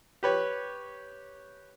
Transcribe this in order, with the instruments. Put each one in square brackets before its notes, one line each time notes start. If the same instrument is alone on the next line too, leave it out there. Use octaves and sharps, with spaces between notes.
[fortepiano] G4 B4 C#5